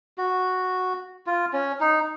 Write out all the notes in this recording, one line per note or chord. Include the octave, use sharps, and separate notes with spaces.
F#4
F4
C#4
D#4